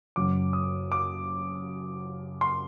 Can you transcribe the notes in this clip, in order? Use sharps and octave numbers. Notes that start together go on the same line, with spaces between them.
F#1 F#2 F#3 D6
D#6
D6
C6